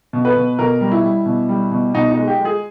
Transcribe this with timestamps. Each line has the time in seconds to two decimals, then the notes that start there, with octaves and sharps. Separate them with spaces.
0.13 B2
0.25 B4
0.36 B2
0.59 B2 A#4
0.81 G3
0.92 E4
1.03 G3
1.26 B2
1.49 G3
1.71 B2
1.94 B2 D#4
2.11 D#4
2.17 G#3
2.27 G4
2.39 G#3
2.45 G#4